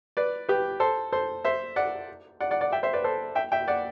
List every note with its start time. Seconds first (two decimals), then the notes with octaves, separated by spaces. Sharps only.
0.17 B4 D5
0.49 G4 B4
0.80 A4 C5
1.12 A4 C5
1.45 C5 E5
1.76 D5 F#5
2.40 D5 F#5
2.51 D5 F#5
2.61 D5 F#5
2.72 E5 G5
2.83 C5 E5
2.93 B4 D5
3.04 A4 C5
3.35 E5 G5
3.52 E5 G5
3.68 D5 F#5